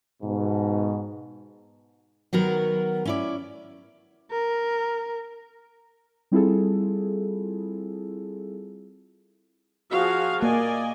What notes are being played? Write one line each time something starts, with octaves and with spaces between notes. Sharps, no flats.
G#2 B2
D#3 F#3 B3 A#4
C#4 E4 D5
A#4
G3 C4 E4 F4 G#4 A4
F3 F#4 G#4 F5
A#3 D5 D#5 G#5